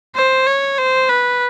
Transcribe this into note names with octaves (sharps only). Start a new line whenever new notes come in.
C5
C#5
C5
B4